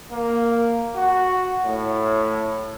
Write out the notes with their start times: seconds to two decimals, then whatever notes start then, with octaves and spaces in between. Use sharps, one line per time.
0.11 A#3
0.96 F#4
1.64 A2